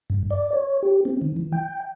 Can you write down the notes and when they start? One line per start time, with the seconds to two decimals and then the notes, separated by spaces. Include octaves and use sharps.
0.10 G2
0.31 D5
0.53 C#5
0.83 G4
1.05 C4
1.22 D#3
1.36 E3
1.52 G5